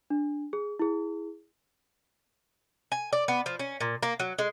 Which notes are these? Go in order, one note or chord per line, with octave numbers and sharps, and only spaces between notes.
D4
G#4
E4 G#4
G#5
D5
B3
F3
C#4
A#2
A#3
F#3
G#3